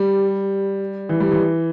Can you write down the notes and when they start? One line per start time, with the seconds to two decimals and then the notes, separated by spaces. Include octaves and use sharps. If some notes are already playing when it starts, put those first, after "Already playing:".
Already playing: G3
1.09 E3
1.20 G3
1.32 E3